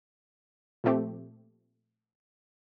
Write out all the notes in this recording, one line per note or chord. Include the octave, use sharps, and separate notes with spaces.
A#2 F3 A3 C4 G4